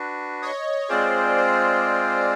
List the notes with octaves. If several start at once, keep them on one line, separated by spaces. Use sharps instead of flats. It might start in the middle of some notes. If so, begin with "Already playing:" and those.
Already playing: D4 F#4 B4
C#5 D#5
G#3 C4 F4 G#4 C5 D5
C5 D5